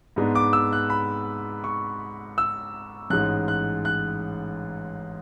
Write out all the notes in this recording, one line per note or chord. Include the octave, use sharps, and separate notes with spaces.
G#2 G#3 B3 D4
D6
E6
F#6
B5
C#6
E6
A1 G#2 G#3 F#6
F#6
F#6